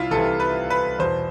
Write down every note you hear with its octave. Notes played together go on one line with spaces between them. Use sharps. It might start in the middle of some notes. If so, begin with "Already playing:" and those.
Already playing: C2 C3 E4 F4
C2 C3 E3 A4
B4
B4
E2 B2 C5